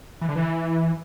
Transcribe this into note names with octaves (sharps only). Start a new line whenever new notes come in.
E3
D3
E3